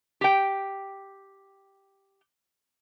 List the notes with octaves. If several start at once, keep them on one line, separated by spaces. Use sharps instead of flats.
G4 G5